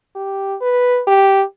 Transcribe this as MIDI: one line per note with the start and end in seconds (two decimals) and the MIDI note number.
0.16 0.56 67
0.61 1.02 71
1.07 1.43 67